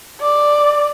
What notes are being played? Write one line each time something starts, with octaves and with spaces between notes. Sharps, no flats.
D5